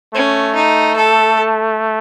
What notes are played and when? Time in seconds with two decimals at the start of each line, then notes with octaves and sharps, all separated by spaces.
0.14 A3 C#4
0.55 D#4
0.96 A4